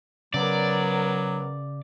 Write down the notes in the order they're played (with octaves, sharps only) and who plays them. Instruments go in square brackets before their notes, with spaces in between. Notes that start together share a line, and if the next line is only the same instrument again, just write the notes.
[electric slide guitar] C#3 [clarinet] F#3 [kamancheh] B3 A#4 [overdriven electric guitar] D5